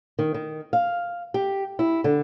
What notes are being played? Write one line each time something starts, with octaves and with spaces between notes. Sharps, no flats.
D#3
D#3
F5
G4
E4
D3